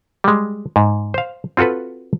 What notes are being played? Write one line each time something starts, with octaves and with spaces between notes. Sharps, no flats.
G3 G#3
G#2
C5 F5
C4 F4 F#4 A4 B4